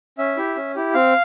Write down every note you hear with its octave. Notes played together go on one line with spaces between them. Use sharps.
C#4 E5
E4 G4
C#4
E4 G4
C4 F5